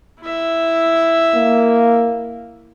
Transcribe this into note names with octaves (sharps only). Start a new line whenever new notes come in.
E4 E5
A#3